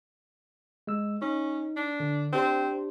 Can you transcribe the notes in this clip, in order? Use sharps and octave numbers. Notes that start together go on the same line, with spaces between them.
G#3 E6
C#4 D#4
D4
D3
C4 D4 G4 C5